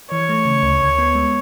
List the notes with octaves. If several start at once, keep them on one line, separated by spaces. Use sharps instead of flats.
E3 C#5
A3
C#3
D2
D2
B3
G#3